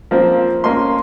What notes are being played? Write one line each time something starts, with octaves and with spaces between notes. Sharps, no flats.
F3 A#3 C4
A#3 C#4 C6